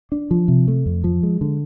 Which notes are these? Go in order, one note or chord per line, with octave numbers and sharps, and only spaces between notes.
D4
F3
C3
A3
F2
F3
G#3
D3